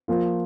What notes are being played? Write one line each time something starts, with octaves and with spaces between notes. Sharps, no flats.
F3 A#3 F4